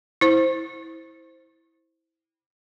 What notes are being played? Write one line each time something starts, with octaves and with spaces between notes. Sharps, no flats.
E4 C5